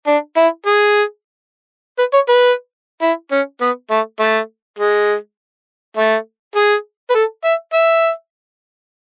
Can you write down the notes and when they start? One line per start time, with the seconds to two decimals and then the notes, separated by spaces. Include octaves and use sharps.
0.07 D4
0.37 E4
0.66 G#4
1.99 B4
2.13 C#5
2.29 B4
3.02 E4
3.31 C#4
3.61 B3
3.90 A3
4.20 A3
4.79 G#3
5.97 A3
6.56 G#4
7.10 B4
7.15 A4
7.44 E5
7.73 E5